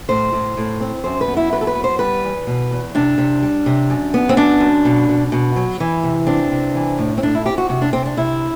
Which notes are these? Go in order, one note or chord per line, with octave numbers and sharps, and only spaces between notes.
A2 C5
A2
A2
C4
F#2 C5
B4
B3
E4
F#3 B4
A4
B4
B3
C5
G3 B4
E2
B2
E2
C3 D4
C3
G3
C3
F#2
B3
C4
F#2 D4
F#2
B2
B2
B2
F#3
E3
C3
C4 D4
C3
E3
A2
C4
A2 D4
E4
C4 G4
F#4
C3 F#4
D4
C3 C4
D4
C3 E4